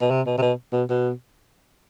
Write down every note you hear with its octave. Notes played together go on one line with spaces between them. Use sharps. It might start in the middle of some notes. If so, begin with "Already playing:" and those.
B2
C3
B2
C3
B2
B2
B2